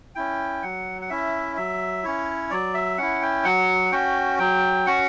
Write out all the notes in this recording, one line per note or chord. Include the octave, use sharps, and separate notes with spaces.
C#4 E4 G5
F#3 F#5
F#5
C#4 E4 E5
F#3 E5
C#4 E4 C#5
F#3 D5
E5
C#4 E4 F#5
G5
F#3 F#5
C#4 F#4 G5
F#3 G5
C#4 F#4 F#5